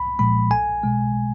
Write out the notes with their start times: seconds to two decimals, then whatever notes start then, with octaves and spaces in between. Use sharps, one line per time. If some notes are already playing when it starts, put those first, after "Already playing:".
Already playing: C2 B5
0.19 A#2 F3 G#3 B5
0.50 B1 G#5
0.84 B2 G#3